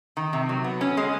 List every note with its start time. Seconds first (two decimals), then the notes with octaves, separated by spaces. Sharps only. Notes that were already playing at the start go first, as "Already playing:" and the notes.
0.17 D#3
0.33 C3
0.49 F#3
0.64 B3
0.81 C#4
0.97 G#3